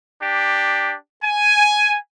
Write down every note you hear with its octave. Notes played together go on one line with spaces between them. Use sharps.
D4 G4
G#5